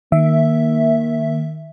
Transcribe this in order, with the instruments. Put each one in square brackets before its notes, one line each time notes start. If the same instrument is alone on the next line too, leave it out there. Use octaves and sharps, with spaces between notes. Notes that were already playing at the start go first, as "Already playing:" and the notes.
[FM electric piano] D#3 E5 [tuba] A#3